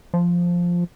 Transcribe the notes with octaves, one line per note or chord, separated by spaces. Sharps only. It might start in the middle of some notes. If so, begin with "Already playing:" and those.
F3